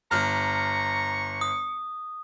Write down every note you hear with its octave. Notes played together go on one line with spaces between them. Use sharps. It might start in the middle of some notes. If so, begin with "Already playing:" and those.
G1 A#5 C#6 F6
D#6